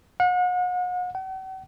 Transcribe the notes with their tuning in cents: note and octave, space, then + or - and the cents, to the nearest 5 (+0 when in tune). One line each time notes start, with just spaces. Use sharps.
F#5 -40
F#5 +45